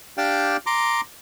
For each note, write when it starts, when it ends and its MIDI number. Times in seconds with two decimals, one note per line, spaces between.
0.18 0.57 62
0.18 0.57 67
0.18 0.57 74
0.18 0.57 77
0.18 0.57 79
0.66 1.01 82
0.66 1.01 84
0.66 1.01 86